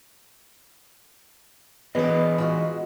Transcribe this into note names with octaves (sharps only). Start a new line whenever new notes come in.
E3 B3 G#4 D5 D#5
G#3 F4 F#4